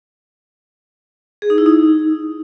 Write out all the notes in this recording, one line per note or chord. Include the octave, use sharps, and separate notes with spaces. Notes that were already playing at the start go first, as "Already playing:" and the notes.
G#4
D#4
E4
D#4